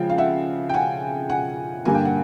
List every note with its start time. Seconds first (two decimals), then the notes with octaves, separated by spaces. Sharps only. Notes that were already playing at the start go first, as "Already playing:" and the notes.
Already playing: C#3 F3 G#3 G5
0.10 F5
0.18 E5 F#5
0.69 G5
0.74 F#5 G#5
1.30 F#5 G#5
1.85 G2 D3 G3 A#3 G#5
1.95 G5
2.05 F#5